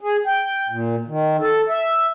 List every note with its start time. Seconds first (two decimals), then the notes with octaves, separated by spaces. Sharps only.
0.01 G#4
0.26 G5
0.70 A#2
1.07 D#3
1.40 A4
1.69 E5